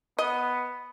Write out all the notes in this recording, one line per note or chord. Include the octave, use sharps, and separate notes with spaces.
B3 D#5